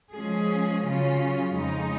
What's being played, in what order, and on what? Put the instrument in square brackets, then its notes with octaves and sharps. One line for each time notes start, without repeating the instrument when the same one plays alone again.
[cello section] F3 G#3 C#4 G#4
C#3 F#3 C#4 F4
F2 C#3 G#3 D#4